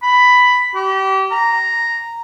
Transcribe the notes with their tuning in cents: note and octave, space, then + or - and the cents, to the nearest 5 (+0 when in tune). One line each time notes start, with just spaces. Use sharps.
B5 +5
G4 -30
A#5 -5